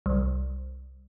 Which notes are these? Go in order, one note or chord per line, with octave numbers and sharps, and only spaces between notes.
C2